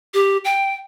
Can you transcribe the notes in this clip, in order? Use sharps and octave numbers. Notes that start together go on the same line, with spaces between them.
G4
G5